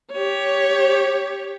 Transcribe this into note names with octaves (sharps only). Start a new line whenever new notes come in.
G4 C#5